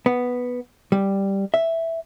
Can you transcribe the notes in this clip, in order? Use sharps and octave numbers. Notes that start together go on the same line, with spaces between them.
B3
G3
E5